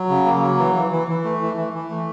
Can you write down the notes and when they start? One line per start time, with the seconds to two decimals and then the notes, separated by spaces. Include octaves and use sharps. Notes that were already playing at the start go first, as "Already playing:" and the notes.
Already playing: F#3
0.09 C#3
0.26 A#3
0.42 F#3
0.59 E3
0.75 E3
0.92 E3
1.08 E3
1.24 A3
1.41 E3
1.57 E3
1.73 E3
1.90 A3